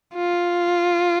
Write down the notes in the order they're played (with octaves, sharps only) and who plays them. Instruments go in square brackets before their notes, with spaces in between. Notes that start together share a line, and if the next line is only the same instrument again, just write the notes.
[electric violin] F4